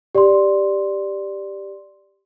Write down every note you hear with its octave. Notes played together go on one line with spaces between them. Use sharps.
G4 D5 C6